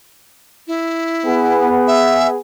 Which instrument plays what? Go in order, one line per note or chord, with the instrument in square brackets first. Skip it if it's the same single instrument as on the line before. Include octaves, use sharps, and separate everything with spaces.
[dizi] E4
[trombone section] B3 G#4
[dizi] E5